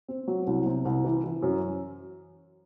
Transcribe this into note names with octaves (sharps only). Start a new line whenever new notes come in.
C4
F#3
C2
C3
C2
E3
E3
F#2